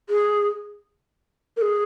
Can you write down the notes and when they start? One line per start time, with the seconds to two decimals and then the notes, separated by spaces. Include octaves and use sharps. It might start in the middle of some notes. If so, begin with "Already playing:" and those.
0.10 G#4
1.57 A#4
1.62 G#4